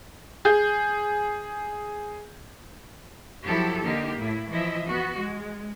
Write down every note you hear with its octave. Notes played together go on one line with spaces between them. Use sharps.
G#4 G6
F3 F#3 E4 G4 A4
D3 A#3 D#4 G4
A2 E4
E3 F3 E4 D#5 E5
B3 F#4
G#3